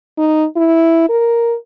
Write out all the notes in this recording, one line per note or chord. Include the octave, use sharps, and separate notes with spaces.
D#4
E4
A#4